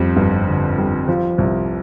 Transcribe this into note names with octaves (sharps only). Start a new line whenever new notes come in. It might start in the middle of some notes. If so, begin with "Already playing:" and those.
Already playing: F2 G3
G1
D3
G3
F3
C2